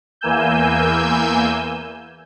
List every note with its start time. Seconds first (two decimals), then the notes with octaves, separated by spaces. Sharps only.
0.21 E2 E3 A#3 G#5 E6 G6